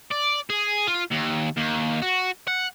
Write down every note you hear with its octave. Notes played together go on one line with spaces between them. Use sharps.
D5
G#4
F4
D#2
D#2
F#4
F#5